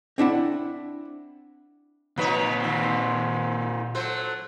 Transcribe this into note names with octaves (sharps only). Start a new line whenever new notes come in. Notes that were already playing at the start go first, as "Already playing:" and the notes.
C4 D4 E4 F#5
A#2 F3 D#4 B4 C#5
D#2 C4
F#3 A3 C5